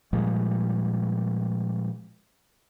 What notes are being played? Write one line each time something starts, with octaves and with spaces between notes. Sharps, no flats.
A#2 F3 G3 G#3